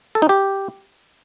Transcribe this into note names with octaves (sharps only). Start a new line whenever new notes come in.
A4
D#4
G4